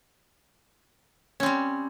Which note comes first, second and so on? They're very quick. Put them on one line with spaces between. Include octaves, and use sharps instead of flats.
C#4 C4 G3